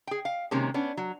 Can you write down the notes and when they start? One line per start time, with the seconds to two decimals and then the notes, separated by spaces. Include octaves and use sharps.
0.07 G#4 G5
0.25 F5
0.51 C3 D#3 G#3 A#3 C#4
0.74 B3 C#4 D4
0.97 F#3